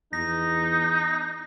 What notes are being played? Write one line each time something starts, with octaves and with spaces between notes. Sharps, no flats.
E2 D#4 A#6